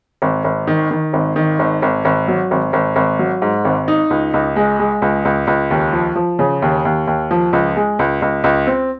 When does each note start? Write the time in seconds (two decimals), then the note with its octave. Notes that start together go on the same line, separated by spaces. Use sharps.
0.22 G#1
0.44 G#1
0.67 D#3
0.91 D#3
1.13 G#1
1.36 D#3
1.59 G#1
1.82 G#1
2.05 G#1
2.28 F#3
2.51 G#1
2.73 G#1
2.96 G#1
3.19 F#3
3.42 G#2
3.65 G#1
3.88 D#4
4.10 C#2
4.34 C#2
4.56 G#3
4.79 G#3
5.02 C#2
5.25 C#2
5.47 C#2
5.71 D#2
5.93 F3
6.16 F3
6.39 C#3
6.62 D#2
6.85 D#2
7.07 D#2
7.31 F3
7.53 C#2
7.76 G#3
7.99 C#2
8.22 C#2
8.44 C#2
8.67 C4